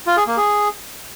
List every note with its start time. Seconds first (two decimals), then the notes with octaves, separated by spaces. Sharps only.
0.07 F4
0.17 G#4
0.27 A#3
0.37 G#4